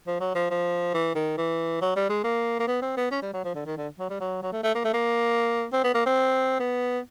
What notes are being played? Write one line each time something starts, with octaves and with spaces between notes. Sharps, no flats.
F3
F#3
F3
F3
E3
D#3
E3
F#3
G3
G#3
A#3
A#3
B3
C4
B3
C#4
G3
F#3
F3
D3
D#3
D3
F#3
G3
F#3
F#3
A3
A3
A#3
A3
A#3
C4
B3
A#3
C4
B3